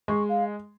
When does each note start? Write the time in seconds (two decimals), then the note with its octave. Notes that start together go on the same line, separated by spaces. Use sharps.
0.08 G#3 C#6
0.29 F5